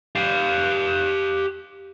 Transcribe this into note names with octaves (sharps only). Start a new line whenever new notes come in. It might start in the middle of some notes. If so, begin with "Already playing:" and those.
G4 F5